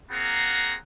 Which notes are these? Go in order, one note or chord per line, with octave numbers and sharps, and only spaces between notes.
A#3 C4 F4 G#4 F#5 A#5